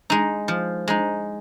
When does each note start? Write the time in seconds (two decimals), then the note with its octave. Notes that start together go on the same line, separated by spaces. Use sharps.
0.10 G#3 D#4
0.48 F3
0.88 G#3 D#4